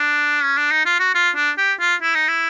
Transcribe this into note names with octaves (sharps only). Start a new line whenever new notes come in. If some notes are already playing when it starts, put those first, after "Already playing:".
Already playing: D4
C#4
D4
D#4
F4
F#4
F4
D4
G4
F4
E4
D#4
E4